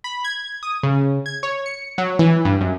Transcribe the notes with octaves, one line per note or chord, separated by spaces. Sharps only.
B5
G#6
D#6
C#3
G#6
C#5
C#7
F#3
E3
G2
F#2